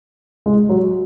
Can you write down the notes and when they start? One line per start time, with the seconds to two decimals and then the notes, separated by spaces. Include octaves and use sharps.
0.46 G#3
0.69 F#3